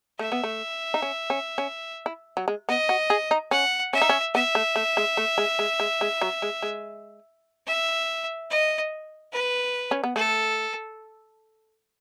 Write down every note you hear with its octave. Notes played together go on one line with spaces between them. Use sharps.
A3 E5
B3
A3
D#4
C#4
C#4
C#4
E4
F#3
G#3
B3 D#5
F#4
G#4
D#4
C#4 F#5
C#4 E5
D#4
C#4
B3 E5
A3
A3
G#3
A3
G#3
G#3
G#3
G#3
F#3
G#3
G#3
E5
D#5
B4
C#4
B3
A3 A4